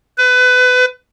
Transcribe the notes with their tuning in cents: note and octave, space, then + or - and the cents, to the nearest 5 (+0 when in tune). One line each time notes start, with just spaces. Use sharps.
B4 +25